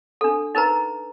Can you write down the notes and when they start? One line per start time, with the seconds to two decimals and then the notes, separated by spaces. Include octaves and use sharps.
0.21 D4 A4
0.55 D#4 A#4 B4 A#5